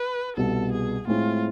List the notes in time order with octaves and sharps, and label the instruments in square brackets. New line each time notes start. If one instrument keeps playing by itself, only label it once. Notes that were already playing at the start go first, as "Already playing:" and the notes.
Already playing: [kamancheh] B4
[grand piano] C2 B2 B3 [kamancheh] A4
[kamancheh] G#4
[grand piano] A2 G#3 C4 E4 [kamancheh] F4